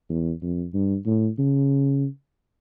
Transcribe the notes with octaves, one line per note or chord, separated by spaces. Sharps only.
E2
F2
G2
A2
C#3